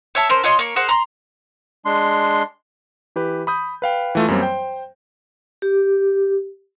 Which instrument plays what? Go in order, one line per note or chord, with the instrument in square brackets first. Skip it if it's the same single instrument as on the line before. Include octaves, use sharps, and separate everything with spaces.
[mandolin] C#5 E5 A5
C#4 A#4 C5
F4 C#5 D#5 C6
A#3 C#5 C#6
G#4 A#4 C5 F#5
A#5 C6
[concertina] G#3 D4 C6
[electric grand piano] E3 G4 B4
B5 D#6 G6
B4 F5 G5
E3 A3 F4
F#2 F#3 G3 A#3 C4
C5 G5
[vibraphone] G4